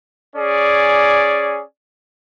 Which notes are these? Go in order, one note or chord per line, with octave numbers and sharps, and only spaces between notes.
C#4 G#4 D5